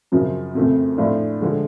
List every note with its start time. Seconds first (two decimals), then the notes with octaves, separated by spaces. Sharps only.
0.12 F#2 C#3 F3
0.55 F2 C#3 F3 A3 C4
0.98 A2 F3 A3 D4 F4
1.41 D3 F3 G#3